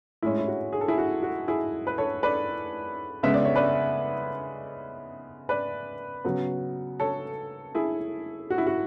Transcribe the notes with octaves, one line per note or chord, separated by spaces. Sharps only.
A2 G#3 C#4 E4
E4
F#4
G#4
A4
E4 G#4
F#4
F#4
E4 G#4
B4
A4 C#5
B4 D5
C#3 G#3 B3 E5
D5
C#5
B4 D5
B4 D5
C#3 F#3 B3
A4 C#5
E4 G#4
F#4
E4
F#4